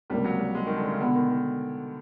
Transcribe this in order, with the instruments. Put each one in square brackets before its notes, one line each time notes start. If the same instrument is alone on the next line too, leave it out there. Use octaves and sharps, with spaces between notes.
[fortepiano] C#2 C3 F3 A#3 [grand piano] G3
[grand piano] F#3
G3
G#3
D#3
D3
C#3
[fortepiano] B2 G#3 B3 [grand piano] D3
[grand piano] D#3
D#3